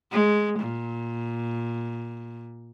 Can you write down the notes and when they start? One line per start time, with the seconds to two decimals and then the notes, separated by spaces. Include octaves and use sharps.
0.12 G#3
0.59 A#2